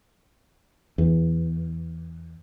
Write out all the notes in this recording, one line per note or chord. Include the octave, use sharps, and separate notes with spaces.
E2